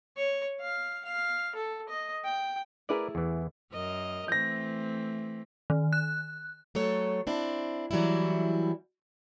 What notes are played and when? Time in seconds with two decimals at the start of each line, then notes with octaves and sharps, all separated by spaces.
0.17 C#5
0.61 F5
1.05 F5
1.55 A4
1.89 D#5
2.25 G5
2.89 A3 E4 G#4 A#4 B4 D5
3.15 E2 E3
3.72 F#2 A#4 D#5
4.28 E3 A3 C4 G6 A#6
5.70 D#3
5.93 F#6
6.75 F#3 A3 A4 C#5
7.27 C4 D4 E4
7.91 E3 F#3 G3 B3 E4